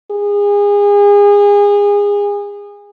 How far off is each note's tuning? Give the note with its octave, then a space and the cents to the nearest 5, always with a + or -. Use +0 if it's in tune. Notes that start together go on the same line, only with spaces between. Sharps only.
G#4 -30